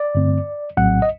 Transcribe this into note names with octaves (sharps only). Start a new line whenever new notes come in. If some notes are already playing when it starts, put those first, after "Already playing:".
Already playing: D5
G2 D3 A3 C4
A#1 A2 F#3 C4 F#5
D#5